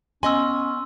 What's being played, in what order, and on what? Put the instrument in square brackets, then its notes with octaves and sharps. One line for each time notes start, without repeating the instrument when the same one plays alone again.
[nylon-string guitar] B3 D#5 G#5 [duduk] C#4 [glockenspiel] C6 E6